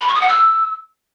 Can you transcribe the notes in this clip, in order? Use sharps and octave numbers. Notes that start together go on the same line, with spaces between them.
B5
C#6
D#6
F#5
E6